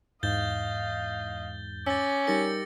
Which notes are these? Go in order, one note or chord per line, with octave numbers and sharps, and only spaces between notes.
E2 G#2 D#5 F5 G6 A6 G7
C#4 D6 E6 A6
G3 D#4 G4 A#4 A6 A#6 C#7